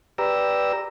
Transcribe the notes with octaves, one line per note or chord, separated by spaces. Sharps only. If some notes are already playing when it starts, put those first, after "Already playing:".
G4 B4 D5 A#5 E6